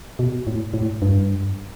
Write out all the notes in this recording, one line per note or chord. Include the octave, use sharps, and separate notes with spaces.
B2
A2
A2
G2